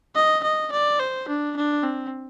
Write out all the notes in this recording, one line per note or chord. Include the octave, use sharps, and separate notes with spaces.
D#5
D#5
D5
C5
D4
D4
C4